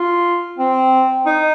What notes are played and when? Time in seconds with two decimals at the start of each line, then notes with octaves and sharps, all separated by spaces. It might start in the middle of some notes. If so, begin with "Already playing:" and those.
Already playing: F4
0.58 C4
1.26 D#4